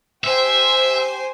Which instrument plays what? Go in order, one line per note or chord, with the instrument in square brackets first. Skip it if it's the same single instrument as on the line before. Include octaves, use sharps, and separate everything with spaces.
[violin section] G4 C5 G#5 [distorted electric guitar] E5